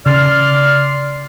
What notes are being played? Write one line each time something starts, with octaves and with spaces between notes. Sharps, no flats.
C#3 D5 C6 F6